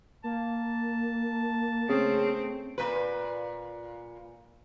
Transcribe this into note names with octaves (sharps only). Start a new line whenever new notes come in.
A#3 A5
C#3 A3 C4
A#2 B4